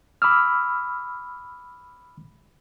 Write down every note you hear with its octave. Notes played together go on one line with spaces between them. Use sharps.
B5 D6 E6 F6